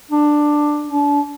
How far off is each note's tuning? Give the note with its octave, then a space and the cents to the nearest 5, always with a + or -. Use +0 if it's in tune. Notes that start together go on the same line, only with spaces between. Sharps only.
D4 +10
D4 -30